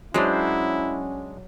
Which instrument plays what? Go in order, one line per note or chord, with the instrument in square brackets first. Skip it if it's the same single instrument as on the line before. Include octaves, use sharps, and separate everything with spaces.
[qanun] F#3 C5 [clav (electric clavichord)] G#3 D4 [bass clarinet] C#4 [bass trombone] E4